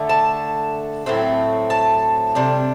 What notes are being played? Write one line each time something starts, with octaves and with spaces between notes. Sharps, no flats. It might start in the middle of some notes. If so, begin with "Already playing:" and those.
Already playing: D3 A3 D4
A5
A2 F#3 A3 C4
A5
C3 G3 D4